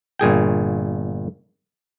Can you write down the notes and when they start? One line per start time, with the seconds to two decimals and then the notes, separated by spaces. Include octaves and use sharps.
0.19 G1 A#2 G#4 G5